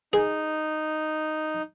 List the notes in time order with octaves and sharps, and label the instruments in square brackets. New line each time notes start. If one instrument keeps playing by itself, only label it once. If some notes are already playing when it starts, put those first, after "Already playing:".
[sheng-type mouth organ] D#4 [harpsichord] G#4